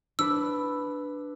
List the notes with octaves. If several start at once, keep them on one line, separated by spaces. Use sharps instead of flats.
D4 B4 E6